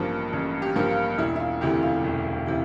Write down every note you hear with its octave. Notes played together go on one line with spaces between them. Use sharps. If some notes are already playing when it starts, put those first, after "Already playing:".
Already playing: A1 G2 F3 A#3 A#4
A1
G4
G2 F3 A#3 G4
F4
E1 E4
E4
F4
D2 C3 E3 G4
F4
E1
C3 E3